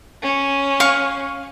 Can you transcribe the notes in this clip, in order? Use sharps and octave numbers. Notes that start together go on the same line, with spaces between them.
C#4
F5 C#6